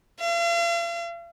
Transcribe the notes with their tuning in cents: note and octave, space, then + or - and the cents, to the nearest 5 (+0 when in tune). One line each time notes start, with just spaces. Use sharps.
F5 -45